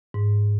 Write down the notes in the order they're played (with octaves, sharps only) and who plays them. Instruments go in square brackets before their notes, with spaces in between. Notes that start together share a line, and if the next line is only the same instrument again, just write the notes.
[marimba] G#2